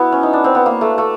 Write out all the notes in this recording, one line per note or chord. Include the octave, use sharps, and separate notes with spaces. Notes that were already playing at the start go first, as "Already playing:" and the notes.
Already playing: B3 E4 F#4
C#4
D#4
D4
C4
B3
A#3
A3
A3